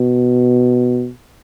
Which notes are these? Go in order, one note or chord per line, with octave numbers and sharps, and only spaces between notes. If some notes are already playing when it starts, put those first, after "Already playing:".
Already playing: B2